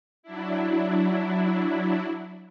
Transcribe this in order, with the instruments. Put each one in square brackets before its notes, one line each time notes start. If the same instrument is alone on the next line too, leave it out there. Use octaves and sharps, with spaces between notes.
[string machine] F#3 D4 E4